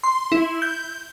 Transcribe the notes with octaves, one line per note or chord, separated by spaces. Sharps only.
C6
E4
G6